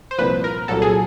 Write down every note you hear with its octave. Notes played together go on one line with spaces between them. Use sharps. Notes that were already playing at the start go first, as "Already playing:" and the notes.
C5
C2 A#2 F3 B4
A#4
C2 A#2 F#3 A4
G#4